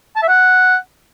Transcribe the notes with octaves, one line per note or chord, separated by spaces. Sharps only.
A5
E5
F#5